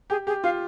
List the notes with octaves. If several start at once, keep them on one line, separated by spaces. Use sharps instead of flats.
G4 G#4
G4 G#4
F4 F5